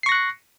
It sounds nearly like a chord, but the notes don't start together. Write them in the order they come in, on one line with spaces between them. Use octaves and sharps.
C7 C#6 A#6 F#6 C#7